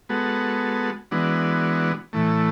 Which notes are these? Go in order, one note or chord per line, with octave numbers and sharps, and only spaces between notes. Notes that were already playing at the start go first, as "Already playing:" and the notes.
G#3 B3 F#4 A4
E3 G#3 B3 D4 F#4
A2 E3 A3